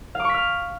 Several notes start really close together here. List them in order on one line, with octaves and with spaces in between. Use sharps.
F5 D6 C#6 B6 F6